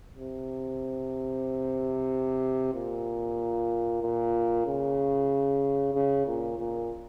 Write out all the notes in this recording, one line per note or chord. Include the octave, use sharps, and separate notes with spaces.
C3
A#2
A#2
C#3
C#3
A#2
A#2